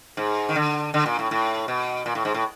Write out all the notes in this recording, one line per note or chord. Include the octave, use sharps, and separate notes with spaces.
G#2
D#3
D3
D3
A#2
A2
A2
B2
A#2
A2
G#2
A2